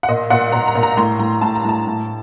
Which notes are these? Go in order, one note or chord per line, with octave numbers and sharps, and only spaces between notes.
F#5
A#2 D#5
A#2 F#5
A#2 A#5
A#5
A#2
A#5
A2 C6
A2 A#5
A2 A5
A#5
A2 A5
A2